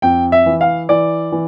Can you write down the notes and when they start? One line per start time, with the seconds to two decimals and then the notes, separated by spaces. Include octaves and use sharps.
0.02 F2 G5
0.32 E5
0.46 E3
0.61 F5
0.89 E3 D5
1.32 E3